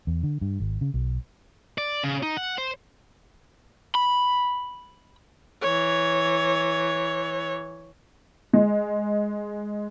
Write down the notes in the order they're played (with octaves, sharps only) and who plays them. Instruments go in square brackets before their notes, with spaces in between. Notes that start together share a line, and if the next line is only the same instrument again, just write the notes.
[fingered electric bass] E2
D3
G2
G#1
C#3
B1
[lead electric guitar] D5
C#3
D#4
F#5
C5
[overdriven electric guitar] B5
[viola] E3 C#5
[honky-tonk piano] G#3